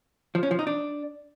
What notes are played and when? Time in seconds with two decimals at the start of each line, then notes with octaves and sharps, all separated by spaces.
0.35 F3
0.43 C#4
0.51 F3
0.59 D#4
0.67 D4